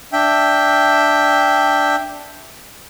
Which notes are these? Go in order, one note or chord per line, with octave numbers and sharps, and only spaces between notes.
D4 E5 G5